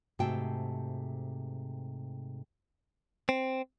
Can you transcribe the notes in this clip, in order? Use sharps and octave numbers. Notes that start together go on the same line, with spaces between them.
G#2 C3 A3 F#4 G5 A5
C4